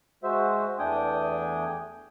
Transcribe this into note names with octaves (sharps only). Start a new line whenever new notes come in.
G#3 F#4 C5 E5
E2 A3 D4 G5 G#5 D#6